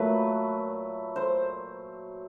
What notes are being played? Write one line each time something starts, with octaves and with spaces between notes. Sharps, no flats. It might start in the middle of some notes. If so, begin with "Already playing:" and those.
Already playing: A#2 F#3 A3 B4
C5